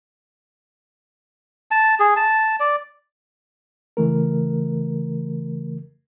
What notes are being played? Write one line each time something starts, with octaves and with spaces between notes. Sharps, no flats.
A5
G#4
A5
D5
C#3 E3 A3 A#4